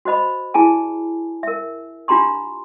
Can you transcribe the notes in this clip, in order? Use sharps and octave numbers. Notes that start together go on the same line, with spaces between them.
F#4 C5 D#5 B5
E4 G#4 G#5 A5
A#4 E5
D4 F4 G4 A#5 C6 C#6